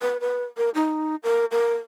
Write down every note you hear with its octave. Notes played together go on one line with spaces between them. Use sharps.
B4
B4
A#4
D#4
A#4
A#4